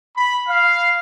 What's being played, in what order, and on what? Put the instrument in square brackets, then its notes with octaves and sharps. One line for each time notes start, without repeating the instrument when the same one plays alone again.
[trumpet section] B5
F5